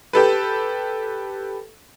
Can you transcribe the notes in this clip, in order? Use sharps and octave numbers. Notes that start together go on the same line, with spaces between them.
G4 A4 B4